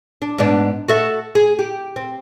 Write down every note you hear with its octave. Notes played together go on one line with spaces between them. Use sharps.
D4
G#2 B3 D4
F#4 A4 E5
G#4
G4
C4